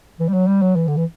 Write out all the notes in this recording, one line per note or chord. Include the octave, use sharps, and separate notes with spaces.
E3
G3
F#3
G3
F#3
E3
D3
E3